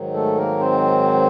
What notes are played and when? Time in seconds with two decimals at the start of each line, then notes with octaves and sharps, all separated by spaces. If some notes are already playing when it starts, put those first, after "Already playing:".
Already playing: G#2 D#3 F#3
0.14 A3 A4
0.37 A#3 A#4
0.60 C4 C5